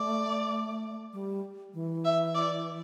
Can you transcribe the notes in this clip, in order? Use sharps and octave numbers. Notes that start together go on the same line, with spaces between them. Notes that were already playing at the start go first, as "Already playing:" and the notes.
Already playing: A3 D5
G3
E3
E5
D5